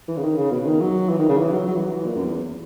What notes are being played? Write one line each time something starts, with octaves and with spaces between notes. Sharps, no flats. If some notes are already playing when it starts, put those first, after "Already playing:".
E3
C#3
D#3
C#3
B2
D#3
F#3
E3
D#3
C#3
E3
F#3
F#3
E3
F#3
E3
A#2
F#2
E2